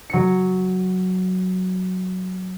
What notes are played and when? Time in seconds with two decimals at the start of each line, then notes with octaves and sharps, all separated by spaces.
0.10 F#3 C#7